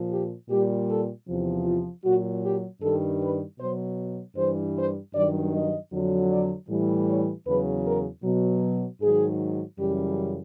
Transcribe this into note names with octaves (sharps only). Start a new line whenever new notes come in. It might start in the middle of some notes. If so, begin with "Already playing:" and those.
Already playing: A#2 F3
G4
A#2 G3 G4
A4
E2 C3 F3
F4
A#2 F#3 F#4
G4
G2 D#3 G3 A4
B4
B2 F#3 C5
G2 E3 G3 C5
C5
G2 D#3 F#3 D5
D#5
F2 D3 F#3
D5
A2 E3 G3
C#5
E2 C#3 F#3 B4
A#4
B2 F#3
G#2 D#3 F#3 G#4
F#2 C#3 E3 G3 G4